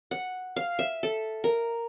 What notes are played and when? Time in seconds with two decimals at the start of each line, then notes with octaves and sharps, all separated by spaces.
0.11 F#5
0.56 F5
0.79 E5
1.03 A4
1.44 A#4